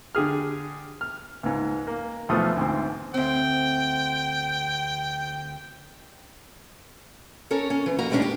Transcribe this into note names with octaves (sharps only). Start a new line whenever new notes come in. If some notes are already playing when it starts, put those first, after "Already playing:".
D3 G4 G#4 F6
F6
C#2 G#2
A#3
B1 E2 F3 A3 D#6
D2 G#2 C4
D2 C4 G5
C#4 A4 A#4 C#5
C#4
E3
F2 A#3 F#4 A#5
D#2 A2 G#3 A3 C#4 D4
G4